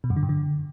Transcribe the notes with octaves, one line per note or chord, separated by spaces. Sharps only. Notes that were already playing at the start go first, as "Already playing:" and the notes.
B2
F#2
D3
G2
D3